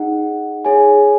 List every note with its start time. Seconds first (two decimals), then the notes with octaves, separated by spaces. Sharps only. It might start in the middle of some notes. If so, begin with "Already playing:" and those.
Already playing: D#4 G#4 D#5 F#5
0.65 G#4 C#5 G#5